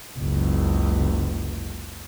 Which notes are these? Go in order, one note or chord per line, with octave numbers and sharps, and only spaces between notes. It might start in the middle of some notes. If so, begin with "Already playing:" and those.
F#1 C#2